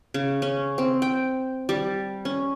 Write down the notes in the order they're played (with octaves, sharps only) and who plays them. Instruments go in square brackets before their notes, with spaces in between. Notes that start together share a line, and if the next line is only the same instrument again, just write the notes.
[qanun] C#3
C#4
C4
G5
G3
C#4